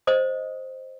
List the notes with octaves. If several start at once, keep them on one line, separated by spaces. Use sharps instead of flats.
C5 D#5 D#6